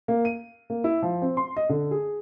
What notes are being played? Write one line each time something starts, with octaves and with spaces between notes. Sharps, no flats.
A#3
D#7
A#3
E4
F3
C4
C6
D#5
D3
G#4